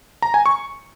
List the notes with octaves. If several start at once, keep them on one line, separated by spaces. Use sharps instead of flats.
A#5
G#5
C#6